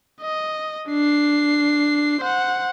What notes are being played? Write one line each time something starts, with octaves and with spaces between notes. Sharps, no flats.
D#5
D4 C7
C5 F#5